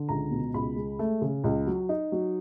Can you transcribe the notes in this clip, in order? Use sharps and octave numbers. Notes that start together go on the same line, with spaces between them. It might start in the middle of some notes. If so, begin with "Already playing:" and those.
Already playing: D3
C#2 A#5
B2
C#2 B5
G#3
A3
C#3
C#2
F#3
D#4
F#3